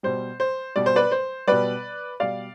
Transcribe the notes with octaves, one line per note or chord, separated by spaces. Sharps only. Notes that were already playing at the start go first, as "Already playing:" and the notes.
B2 G3 C5
C5
B2 G3 D5
C5
B4 D5
C5
B2 G3 B4 D5
B2 G3 D5 F5